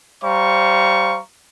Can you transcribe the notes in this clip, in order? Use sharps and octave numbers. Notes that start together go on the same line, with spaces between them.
G3 C5 F5 A#5 C#6